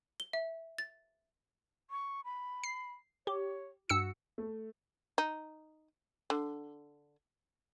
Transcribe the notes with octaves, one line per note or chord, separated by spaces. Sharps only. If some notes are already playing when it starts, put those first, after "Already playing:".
G7
E5
A6
C#6
B5
C7
G4 C#5
G2 F#4 E6 C#7
A3
D#4
D3